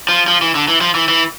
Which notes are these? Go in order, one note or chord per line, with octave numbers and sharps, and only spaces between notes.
F3
F3
E3
D3
E3
F3
E3
E3